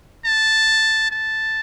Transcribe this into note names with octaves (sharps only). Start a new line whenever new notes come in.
A5
A5